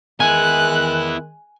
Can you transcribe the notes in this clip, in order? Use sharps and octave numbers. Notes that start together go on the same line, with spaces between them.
D#3 G#3 B3 E4 G#5 F#6